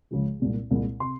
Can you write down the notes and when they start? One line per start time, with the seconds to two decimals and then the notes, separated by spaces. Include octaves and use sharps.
0.11 C#2 C#3 F3 G#3
0.40 C2 A#2 G#3
0.71 C2 A#2 G#3
1.00 C3 C6